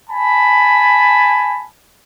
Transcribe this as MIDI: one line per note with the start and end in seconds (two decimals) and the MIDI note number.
0.10 1.63 80
0.10 1.63 81
0.10 1.63 83